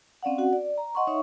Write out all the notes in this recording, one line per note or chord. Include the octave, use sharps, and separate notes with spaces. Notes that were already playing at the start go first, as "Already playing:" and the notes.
C4 C#4 D5 F5 F#5
F#4 F#5
D5
A#5
D#5 F#5 C6 C#6
D#4 C#5 E5 C#6